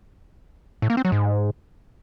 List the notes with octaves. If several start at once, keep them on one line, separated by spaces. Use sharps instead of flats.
A2
A#3
C4
F#3
G#2